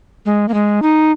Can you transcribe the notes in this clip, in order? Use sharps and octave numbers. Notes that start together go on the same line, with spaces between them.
G#3
A#3
G#3
D#4